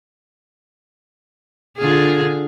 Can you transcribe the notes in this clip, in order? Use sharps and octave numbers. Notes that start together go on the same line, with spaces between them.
D3 F4 G#4